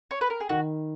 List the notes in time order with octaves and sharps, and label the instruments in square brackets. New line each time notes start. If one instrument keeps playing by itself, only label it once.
[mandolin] C#5
B4
A#4
G#4
[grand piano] D#3 [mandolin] F#4